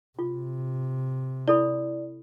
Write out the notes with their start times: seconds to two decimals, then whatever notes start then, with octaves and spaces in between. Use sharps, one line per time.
0.19 C3 F4
1.48 E4 A4 D5 B5